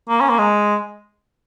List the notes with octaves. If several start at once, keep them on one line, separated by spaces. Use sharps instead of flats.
A#3
C#4
A#3
G#3